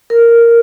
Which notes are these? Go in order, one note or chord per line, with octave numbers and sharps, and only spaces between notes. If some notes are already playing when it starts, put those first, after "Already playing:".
A#4